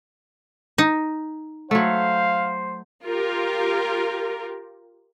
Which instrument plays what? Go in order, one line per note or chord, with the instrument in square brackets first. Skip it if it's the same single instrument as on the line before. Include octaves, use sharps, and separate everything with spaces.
[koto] D#4
[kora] F#3 A3 [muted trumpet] C5 [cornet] F5
[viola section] F4 G4 A#4